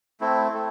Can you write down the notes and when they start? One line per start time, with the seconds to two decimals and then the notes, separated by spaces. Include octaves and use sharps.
0.21 A3 C4 E4
0.54 A3